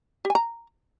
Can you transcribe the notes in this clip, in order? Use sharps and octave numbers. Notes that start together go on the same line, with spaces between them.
G4
G#5
A#5